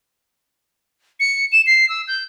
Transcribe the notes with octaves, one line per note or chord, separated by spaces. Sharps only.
C#7
E7
C7
E6
G6